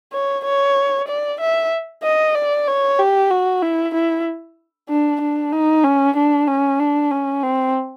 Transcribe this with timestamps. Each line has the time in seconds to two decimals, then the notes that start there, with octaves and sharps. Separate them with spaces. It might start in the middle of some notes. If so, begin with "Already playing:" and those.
0.13 C#5
0.45 C#5
1.08 D5
1.40 E5
2.03 D#5
2.35 D5
2.67 C#5
2.99 G4
3.31 F#4
3.62 E4
3.94 E4
4.89 D4
5.21 D4
5.52 D#4
5.84 C#4
6.16 D4
6.47 C#4
6.79 D4
7.11 C#4
7.43 C4